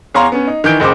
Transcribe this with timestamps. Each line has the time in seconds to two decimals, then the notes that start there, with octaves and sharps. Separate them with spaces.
0.14 E2 C#5 F5 A#5 C6
0.32 B3 C#4
0.47 D#4
0.64 D#3 E3 G6 D7
0.80 F#1 C#2 C5 D6